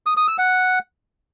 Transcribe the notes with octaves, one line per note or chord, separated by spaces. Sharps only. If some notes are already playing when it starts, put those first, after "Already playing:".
D#6
D#6
E6
F#5